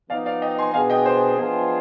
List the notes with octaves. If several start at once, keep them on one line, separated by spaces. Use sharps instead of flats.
F3 B3 D#4 D5 F5
D5 F5
D#5 G5
G#5 C6
B2 B3 D4 G#4 F5 G#5
D#5 G5
C5
F3 B3 D4 F4 G#4